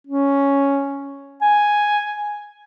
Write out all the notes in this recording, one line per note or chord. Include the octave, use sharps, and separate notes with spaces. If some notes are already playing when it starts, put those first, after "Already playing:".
C#4
G#5